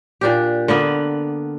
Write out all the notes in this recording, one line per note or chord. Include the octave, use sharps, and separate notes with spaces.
A#2 D4 G4
D3 A#3 B3 B4